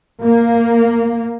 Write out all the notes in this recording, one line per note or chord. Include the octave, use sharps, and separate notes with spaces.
A#3